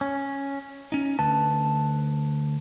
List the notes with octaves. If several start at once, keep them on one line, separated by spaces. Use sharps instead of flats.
C#4
C#4 D#4
D2 B4 A5